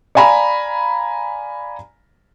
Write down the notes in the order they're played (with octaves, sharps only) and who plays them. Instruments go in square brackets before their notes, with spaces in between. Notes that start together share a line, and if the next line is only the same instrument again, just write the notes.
[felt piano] D5 F5 G#5 A#5 B5